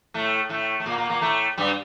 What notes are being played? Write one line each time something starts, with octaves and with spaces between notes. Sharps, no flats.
A2 A3
A2 A3
A3
A#2 A#3
A#2 A#3
A#2 A#3
A2 A3
G2 G3